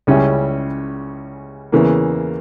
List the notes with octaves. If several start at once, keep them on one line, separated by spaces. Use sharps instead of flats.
C#2 C#3 G3 C#4 E4
E2 C#3 E3 A#3